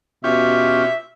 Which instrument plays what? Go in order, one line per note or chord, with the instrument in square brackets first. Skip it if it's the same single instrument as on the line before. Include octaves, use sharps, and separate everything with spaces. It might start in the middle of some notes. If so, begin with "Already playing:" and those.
[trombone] B2 [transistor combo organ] C#4 F4 G4 [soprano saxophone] E5